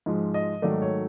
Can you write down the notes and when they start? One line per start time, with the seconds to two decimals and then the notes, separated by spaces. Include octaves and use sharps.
0.06 G#2 F3 G#3
0.34 D#5
0.62 G#2 D#3 F#3 A3 D5
0.82 C#5